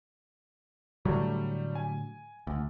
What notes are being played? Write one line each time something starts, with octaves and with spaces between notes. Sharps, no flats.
A2 D3 F#3 G3 A3
G#5
D2